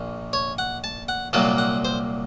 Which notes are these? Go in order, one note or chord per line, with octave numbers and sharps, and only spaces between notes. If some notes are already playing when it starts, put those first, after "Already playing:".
Already playing: A#1 A#2
C#5
F#5
A5
F#5
C2 A#2 F#3 A#3 A5
F#5
C5